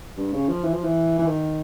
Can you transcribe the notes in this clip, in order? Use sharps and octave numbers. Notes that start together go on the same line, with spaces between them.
G2
C#3
F3
E3
F3
E3
E3
D#3